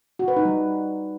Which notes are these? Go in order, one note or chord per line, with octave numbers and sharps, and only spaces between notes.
F#4
B4
D#4
G3